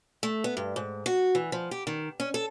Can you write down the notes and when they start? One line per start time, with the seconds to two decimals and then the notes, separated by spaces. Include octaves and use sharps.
0.23 A3
0.44 B3
0.57 G2
0.76 G#2
1.06 F#4
1.35 E3
1.52 F3
1.71 G4
1.87 D#3
2.20 C#4
2.34 A4